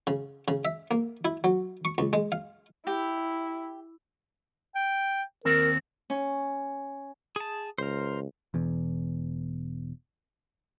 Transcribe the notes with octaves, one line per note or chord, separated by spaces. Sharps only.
C#3
C#3
E5
A#3
E4
F#3
C#6
C#2
G#3
F5
E4 G4
G5
D#2 C4 A#4
C#4
G#4 A5
C#2 A#4 C5
E1 E2